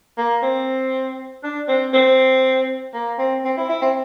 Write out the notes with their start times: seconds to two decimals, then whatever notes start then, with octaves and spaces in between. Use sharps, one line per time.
0.18 A#3
0.43 C4
1.44 D4
1.68 C4
1.93 C4
2.94 A#3
3.18 C4
3.45 C4
3.57 E4
3.69 E4
3.82 C4